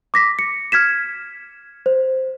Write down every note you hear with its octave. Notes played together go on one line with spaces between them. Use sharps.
D6 A#6 B6
C#7
F6 G#6 B6 E7
C5